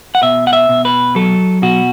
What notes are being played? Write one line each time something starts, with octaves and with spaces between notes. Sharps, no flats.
F#5
B2 E5
F#5
E5
B2
B4
F#3 A4
B2 F#4